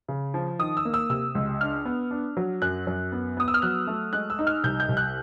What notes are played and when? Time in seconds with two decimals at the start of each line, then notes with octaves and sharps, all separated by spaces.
0.08 C#3
0.34 F3
0.59 D#3 D#6
0.77 E6
0.85 A#3
0.94 E6
1.09 C3 E6
1.35 C#2
1.61 D4 F6
1.85 B3
2.11 D4
2.37 F#3
2.62 F#2 F#6
2.87 F#2
3.12 B3
3.37 B3 D#6
3.48 E6
3.54 F6
3.62 F#3 F#6
3.87 A3
4.13 G#3 F#6
4.30 E6
4.39 D#4
4.47 F6
4.64 C2 G6
4.80 G6
4.89 C2
4.97 F#6